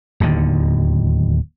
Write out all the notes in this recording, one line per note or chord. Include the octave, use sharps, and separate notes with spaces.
D1 D#2 D3 D#3